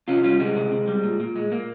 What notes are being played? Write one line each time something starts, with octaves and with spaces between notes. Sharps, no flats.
C3 C#4 F4
G3 C#4 F4
C3 G#3 C4
C3
C3
G3
A#2
A#2
G#3
A#2 A#3